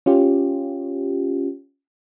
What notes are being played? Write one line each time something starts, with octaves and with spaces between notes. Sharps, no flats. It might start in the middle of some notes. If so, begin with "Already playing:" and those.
C#4 F4 G4